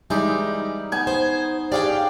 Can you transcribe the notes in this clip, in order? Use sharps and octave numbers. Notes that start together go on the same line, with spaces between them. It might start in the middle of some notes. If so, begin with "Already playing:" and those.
E3 G3 G#3 D#4 D5
B3 G#5
C5
C#4 D4 G4 G#4 D5 F5 G5